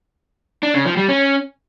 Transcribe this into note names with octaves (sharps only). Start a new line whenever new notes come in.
D4
C#3
F3
G3
C#4